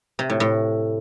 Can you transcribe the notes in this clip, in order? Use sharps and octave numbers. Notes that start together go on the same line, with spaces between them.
C3
A2
A2